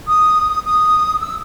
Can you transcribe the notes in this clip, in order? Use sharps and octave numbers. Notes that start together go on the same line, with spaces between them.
D#6
D#6
E6